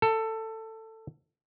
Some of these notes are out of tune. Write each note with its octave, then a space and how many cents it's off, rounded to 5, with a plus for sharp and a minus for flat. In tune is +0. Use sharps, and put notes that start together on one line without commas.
A4 +15